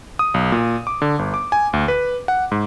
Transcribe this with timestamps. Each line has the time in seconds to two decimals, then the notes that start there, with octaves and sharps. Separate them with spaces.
0.19 D#6
0.34 B1
0.52 A#2
0.87 D6
1.02 D3
1.19 G1
1.34 D6
1.52 G#5
1.73 D2
1.88 B4
2.28 F#5
2.52 G#2